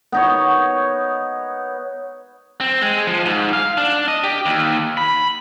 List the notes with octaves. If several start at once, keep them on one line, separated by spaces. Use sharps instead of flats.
B3 D#4 C#5
C4
G#3
F3
G#2
F5
D4
D#5
G4
D#2
B5